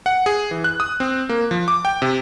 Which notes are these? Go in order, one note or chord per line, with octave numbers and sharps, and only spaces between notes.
F#5
G#4
E3
F#6
D#6
C4
A#3
F3
D6
G5
C3